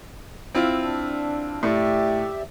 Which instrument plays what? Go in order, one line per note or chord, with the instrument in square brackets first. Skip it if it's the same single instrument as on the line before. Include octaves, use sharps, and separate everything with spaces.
[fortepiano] C4 E4 F4
[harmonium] D4
[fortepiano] A2 [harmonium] G4 D5 E5